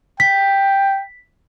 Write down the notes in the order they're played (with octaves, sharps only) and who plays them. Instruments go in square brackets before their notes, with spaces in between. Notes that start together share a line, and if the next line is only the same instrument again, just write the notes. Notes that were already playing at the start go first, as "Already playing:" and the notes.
[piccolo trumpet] G5 [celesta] B6